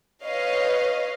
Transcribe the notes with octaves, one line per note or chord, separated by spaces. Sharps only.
B4 C#5 D#5 F5